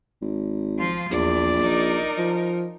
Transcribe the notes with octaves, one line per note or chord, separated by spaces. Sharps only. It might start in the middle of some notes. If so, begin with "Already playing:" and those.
G#1
F3 F4
A#1 E2 D5
D#4 A#4
F3